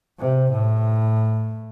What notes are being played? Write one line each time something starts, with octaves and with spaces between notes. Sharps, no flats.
C3
A2